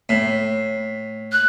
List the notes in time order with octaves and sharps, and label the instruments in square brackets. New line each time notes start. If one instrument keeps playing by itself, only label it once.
[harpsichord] A2
[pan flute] F#6